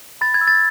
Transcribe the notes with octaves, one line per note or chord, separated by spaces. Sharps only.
B5 A6
G#6
E6
A6